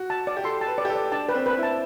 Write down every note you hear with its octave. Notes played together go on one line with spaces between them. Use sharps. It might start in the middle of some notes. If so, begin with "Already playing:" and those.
Already playing: F#4
A5
D5
G4
A4 C6
A5
B4
D5
G4
A4
D5
D4 A5
B4
C4
B4
E4
A5